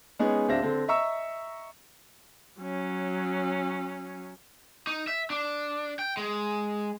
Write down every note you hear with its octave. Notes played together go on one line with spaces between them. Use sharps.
G#3 B3 C#4 D#4 G#4
D1 C4 D4 E5 F5 A#6
D3 C4
D#5 E5 A#5 C#6 E6
F#3 C#4
D#4
E5
D4
G5
G#3